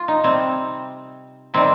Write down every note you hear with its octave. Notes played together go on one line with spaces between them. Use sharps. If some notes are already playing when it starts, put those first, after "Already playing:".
Already playing: F4
D#4
C3 G3 C4
C3 D#3 G3 C4